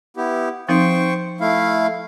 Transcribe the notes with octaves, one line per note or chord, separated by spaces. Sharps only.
B3 E4 G4
F3 C4 D#4 C5 G5 C#6
A3 E4 F5